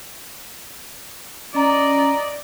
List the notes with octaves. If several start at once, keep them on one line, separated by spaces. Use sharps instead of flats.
C#4 D5 D#5 A#5